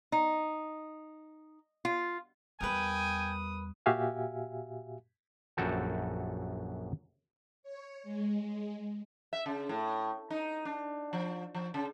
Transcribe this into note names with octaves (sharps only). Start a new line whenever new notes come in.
D#4
F4
E2 G3 A#4 B4 G5 G#5 D#6
A#2 F#4 G4 E5 F5 G#5
A#1 F#2 F#4 A4 G5
C#5
G#3
E5
C#3
A2
D#4
D4
F3
F3
C#3